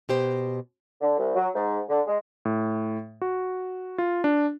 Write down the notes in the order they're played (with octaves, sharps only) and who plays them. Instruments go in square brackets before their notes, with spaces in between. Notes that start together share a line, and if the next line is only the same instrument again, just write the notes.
[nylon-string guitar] B2 G4 C5
[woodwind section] D3
C2
F#3
G#2
D3
G#3
[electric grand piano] A2
F#4
F4
D4